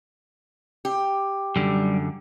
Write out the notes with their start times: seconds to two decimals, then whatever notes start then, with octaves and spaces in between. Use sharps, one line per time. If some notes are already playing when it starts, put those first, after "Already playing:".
0.85 G4
1.56 F#2 D3 G3